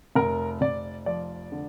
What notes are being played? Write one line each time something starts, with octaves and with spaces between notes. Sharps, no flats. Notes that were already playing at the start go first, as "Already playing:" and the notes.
F1 A#4
F1 D5
F3 D5
D3